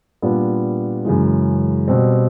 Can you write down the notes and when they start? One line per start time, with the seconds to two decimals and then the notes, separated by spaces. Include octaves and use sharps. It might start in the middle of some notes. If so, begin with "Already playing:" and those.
0.22 A#2 G3 B3 D4 F4
1.05 F#2 C#3 E3 G#3
1.88 B2 G3 C4